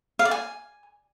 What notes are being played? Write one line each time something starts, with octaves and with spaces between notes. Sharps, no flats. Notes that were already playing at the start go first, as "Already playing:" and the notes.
F5
D5
G#5